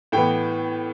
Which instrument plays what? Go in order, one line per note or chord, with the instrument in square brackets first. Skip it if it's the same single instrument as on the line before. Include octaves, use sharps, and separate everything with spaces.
[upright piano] A2 E3 B3 G5